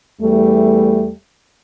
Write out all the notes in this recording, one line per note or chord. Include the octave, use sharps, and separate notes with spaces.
E2 G3 A3